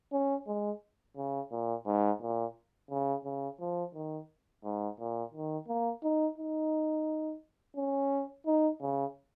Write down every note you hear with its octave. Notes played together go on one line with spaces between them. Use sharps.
C#4
G#3
C#3
A#2
G#2
A#2
C#3
C#3
F3
D#3
G#2
A#2
D#3
A#3
D#4
D#4
C#4
D#4
C#3